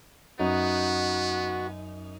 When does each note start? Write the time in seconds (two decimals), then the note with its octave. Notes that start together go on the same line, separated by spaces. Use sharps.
0.40 F#2 B3 D#4 F#4